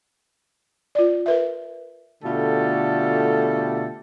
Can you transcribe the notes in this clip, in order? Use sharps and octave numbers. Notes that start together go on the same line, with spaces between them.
F4 D5
A#4 B4 E5
B2 D3 A3 F4 G4 A4